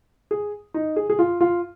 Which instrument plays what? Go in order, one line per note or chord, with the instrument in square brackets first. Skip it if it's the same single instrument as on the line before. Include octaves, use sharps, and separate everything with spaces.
[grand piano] G#4
D#4
G#4
G#4
F4
F4